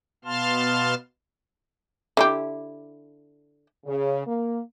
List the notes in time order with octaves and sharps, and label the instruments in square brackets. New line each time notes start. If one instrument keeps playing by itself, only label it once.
[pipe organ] B2 B3 F5 A5 C6 F6
[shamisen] D3 E4 G4
[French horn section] C#3
A#3